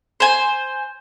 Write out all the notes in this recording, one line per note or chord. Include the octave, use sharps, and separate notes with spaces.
C5 G#5